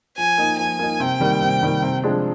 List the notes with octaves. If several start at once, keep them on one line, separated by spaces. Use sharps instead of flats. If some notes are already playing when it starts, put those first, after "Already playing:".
F3 G#5
A#3 D#4
F3 G#5
A#3 D#4
C3 G5
D#3 G3 A#3
C3
D#3 G3 A#3
C3
F3 G#3 D4